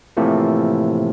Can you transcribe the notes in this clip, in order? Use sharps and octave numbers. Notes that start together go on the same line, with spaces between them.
A2 C3 E3 F3 A3 A#3